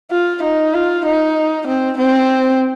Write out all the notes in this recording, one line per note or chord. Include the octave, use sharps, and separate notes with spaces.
F4
D#4
F4
D#4
C4
C4